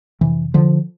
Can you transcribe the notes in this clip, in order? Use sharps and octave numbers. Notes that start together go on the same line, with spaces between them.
F2 C3 E3
D3 F3